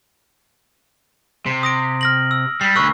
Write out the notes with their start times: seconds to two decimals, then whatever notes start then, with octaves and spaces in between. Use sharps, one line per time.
1.46 C3
1.63 D#6 A#6 D7
2.01 F6 A#6 F#7
2.31 E6
2.61 G3 C7
2.76 D2 B4 C#6 E6